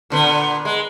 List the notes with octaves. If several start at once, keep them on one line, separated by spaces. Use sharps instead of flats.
A#2 D3 B3
G#3